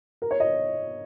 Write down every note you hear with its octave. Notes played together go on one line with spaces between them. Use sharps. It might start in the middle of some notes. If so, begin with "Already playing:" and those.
A#4
C#5
D#5